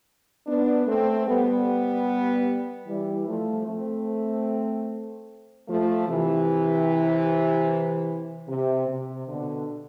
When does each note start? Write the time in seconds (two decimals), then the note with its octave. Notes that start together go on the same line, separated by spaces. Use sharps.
0.46 B3 D4
0.86 A3 C4
1.26 G3 B3
2.87 E3 G3
3.27 F3 A3
3.67 A3 C4
5.68 F3 A3
6.08 C3 E3
8.48 C3
8.88 C3
9.27 B2 D3